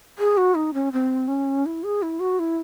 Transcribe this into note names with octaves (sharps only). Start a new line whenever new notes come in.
G#4
F#4
D#4
C#4
C4
C#4
E4
G#4
E4
F#4
E4